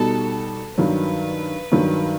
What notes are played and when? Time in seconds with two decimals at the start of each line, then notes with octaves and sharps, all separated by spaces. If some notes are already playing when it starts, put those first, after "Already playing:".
Already playing: B2 G3 D#4 F#4 A4
0.77 G2 D#3 F#3 B4
1.72 G2 D#3 F#3